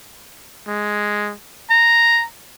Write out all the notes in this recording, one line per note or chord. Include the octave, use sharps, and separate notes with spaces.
G#3
A#5